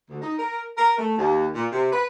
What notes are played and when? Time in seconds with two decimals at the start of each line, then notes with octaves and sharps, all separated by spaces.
0.09 D2
0.21 D#4
0.38 A#4
0.77 A#4
0.98 A3
1.18 D#2
1.55 A#2
1.72 C3
1.92 B4